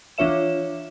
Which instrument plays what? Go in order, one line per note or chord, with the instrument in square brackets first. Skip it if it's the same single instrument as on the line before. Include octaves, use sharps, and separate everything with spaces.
[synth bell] E3 D4 F4 C#5 E5 E7